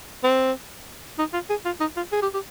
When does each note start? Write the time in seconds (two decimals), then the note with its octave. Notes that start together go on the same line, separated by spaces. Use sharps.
0.24 C4
1.18 D#4
1.33 F4
1.50 G#4
1.65 F4
1.80 D#4
1.97 F4
2.12 G#4
2.22 G4
2.34 G4